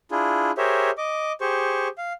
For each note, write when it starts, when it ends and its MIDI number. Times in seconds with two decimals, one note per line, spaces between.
0.11 0.51 62
0.11 0.51 64
0.11 0.51 65
0.11 0.51 68
0.58 0.91 67
0.58 0.91 68
0.58 0.91 70
0.58 0.91 72
0.58 0.91 73
0.58 0.91 76
0.98 1.32 75
0.98 1.32 86
1.41 1.88 67
1.41 1.88 68
1.41 1.88 72
1.41 1.88 85
1.98 2.13 77